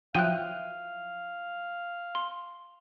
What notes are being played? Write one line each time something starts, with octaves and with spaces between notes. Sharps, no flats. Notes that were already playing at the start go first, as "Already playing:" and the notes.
F3 F#3 E4 B4 F5 G5 F#6 D#7
C6